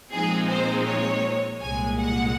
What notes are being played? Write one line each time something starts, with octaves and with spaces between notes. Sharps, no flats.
A#2 F3 G#3 C4 D#4 G#4
C5
C#5
C2 A#2 G#3 G#5
F#5